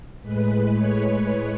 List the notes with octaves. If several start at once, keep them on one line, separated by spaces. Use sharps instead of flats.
A2 G#3 B4
C#5